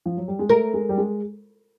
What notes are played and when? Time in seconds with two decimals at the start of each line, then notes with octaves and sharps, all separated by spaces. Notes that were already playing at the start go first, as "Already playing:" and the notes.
0.06 F3
0.17 F#3
0.28 G3
0.39 G#3
0.49 A3 A#4
0.74 G#3
0.89 G3
0.98 G#3